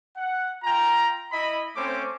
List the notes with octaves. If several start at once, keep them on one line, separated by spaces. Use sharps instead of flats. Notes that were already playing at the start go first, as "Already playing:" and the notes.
F#5
F4 G5 A#5
E4 D#5 B5
A3 C4 C#4 C5 D6